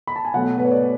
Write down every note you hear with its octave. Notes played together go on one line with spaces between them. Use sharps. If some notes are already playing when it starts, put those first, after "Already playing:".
B5
A5
G#5
B2 F#3 A3 F#5
B4
C#5
D5